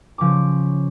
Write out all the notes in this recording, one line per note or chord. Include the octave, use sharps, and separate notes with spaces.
C#3 F3 C#6 D6